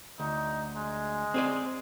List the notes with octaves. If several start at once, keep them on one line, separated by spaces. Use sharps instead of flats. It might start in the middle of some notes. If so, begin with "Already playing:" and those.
D2 D#4
G#3
C4 G#4 D5